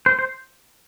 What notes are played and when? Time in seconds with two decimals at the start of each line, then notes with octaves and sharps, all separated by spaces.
0.06 C5
0.19 C5